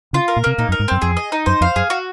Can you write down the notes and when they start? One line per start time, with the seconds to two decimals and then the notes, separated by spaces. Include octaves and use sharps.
0.13 C#3 F4
0.28 A#4
0.36 A#2
0.44 C3 A#3
0.58 A#2 D#4
0.69 F#2
0.72 A#4
0.79 G#2
0.88 F#2 C4
1.02 F2 G#4
1.17 D#5
1.32 D#4
1.46 F#2 C5
1.61 F2 F5
1.76 F#2 G#4
1.90 F#4